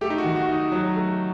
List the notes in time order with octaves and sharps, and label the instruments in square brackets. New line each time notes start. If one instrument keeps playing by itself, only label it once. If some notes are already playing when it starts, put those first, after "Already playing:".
[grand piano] A3 [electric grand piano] G4
[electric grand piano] D#4
F#4
[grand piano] D#3
[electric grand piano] F#4
[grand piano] D#4
F#3
A3